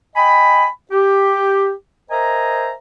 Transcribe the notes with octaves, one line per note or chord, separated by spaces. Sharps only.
D#5 G5 G#5 B5
G4
A#4 C5 D#5 E5 G#5 A#5